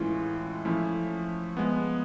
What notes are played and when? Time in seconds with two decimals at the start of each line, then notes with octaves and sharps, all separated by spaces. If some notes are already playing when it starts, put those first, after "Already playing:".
Already playing: A2 E3 G#3 C#4 F4
0.65 F3 A3 C#4 E4
1.57 F3 G#3 B3